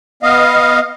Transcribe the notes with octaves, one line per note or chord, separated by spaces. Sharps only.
B3 D#5 F5